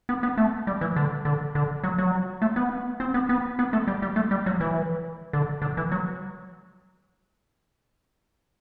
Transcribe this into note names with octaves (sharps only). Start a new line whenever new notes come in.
B3
B3
A3
G3
E3
D3
D3
D3
F#3
F#3
A3
B3
C4
B3
B3
B3
A3
G3
G3
A3
G3
F#3
E3
D3
D3
E3
F#3